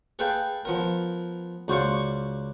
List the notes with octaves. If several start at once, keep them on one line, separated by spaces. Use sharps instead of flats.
G#4 A4 B4 F5 G5 A5
F3 B3 A#4
C#2 F#4 C5 D5 F5 C#6